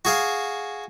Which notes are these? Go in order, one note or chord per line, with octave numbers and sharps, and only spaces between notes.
F#4 G#4 F5